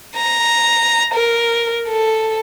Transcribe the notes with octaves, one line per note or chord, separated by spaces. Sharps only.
A#5
A#4
A4